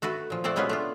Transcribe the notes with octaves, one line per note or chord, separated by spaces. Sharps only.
A3 F#4 A4 B4
A#2 F3
A3 C4 C5 D5 F#5
B2 G#3 B3 C#4 F4 B4
A3 D4 F4